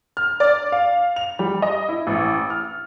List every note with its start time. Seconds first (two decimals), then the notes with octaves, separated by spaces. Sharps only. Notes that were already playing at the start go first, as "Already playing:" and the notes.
0.17 F6
0.40 D5
0.72 F5
1.16 F7
1.39 G3
1.62 D#5
1.89 E4
2.07 A1
2.50 F6